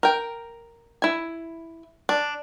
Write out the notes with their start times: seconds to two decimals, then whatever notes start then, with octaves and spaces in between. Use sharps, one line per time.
0.03 A#4 G5
1.02 E4 G#5
2.09 D4